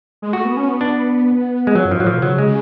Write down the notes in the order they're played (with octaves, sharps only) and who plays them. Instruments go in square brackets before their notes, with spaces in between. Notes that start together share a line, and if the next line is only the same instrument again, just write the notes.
[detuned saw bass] G#3
[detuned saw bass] A3 [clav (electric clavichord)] F#4
[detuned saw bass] B3
C#4
B3
[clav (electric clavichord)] D4
G#3
[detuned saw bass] F3 [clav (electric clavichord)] F#3
[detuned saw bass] F#2
[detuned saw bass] G#2 [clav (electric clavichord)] F3
[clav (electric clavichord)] F#3
[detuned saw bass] A2 [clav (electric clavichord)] F3
[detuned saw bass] B2
[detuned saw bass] C#3 [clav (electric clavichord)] F#3
[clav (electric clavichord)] G#3
[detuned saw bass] C#3